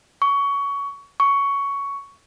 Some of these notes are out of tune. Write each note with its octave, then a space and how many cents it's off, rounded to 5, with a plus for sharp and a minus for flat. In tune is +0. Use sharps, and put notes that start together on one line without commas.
C#6 +20
C#6 +10